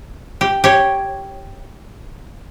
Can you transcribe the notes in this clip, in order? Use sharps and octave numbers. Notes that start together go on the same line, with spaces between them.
G4
G4 C#5